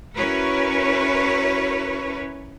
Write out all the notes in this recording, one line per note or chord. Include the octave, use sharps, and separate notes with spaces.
C#4 E4 F#4 A#4 B4 C#5